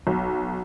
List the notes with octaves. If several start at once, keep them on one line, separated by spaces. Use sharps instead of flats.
B1